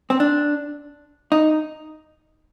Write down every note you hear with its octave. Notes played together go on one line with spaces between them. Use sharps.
C4
D4
D#4